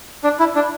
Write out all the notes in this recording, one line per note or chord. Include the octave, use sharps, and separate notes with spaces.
D4
E4
D4